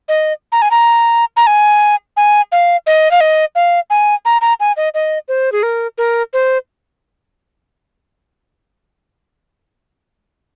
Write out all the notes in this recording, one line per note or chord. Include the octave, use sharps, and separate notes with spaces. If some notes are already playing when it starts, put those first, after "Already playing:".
D#5
A#5
G#5
A#5
A#5
G#5
G#5
F5
D#5
F5
D#5
F5
G#5
A#5
A#5
G#5
D#5
D#5
C5
G#4
A#4
A#4
C5